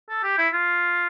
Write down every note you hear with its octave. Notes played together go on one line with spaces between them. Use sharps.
A4
G4
E4
F4